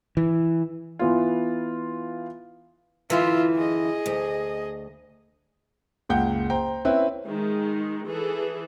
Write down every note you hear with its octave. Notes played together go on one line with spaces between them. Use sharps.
E3
E3 B3 F4
F#2 D3 E3 F4 E5
G#4 D#5
D2
F#1 C#2 F#5 G5 G6
C5 G5 A#5
C4 C#4 E4 B4 E5
D#3 G#3
E3 G#4 A4